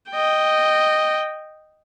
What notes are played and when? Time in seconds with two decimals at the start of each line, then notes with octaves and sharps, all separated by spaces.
0.11 D#5 G5